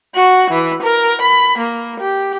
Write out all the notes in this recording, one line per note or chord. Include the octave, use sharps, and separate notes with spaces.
F#4
E3
A#4
B5
A#3
G4